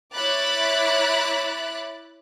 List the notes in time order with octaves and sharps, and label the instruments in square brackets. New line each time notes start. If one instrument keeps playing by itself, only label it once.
[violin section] E4 C#5 B5 D6 F#6 A6